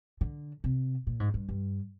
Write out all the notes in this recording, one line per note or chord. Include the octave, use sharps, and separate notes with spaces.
D3
C3
A#2
G#2
G2
G2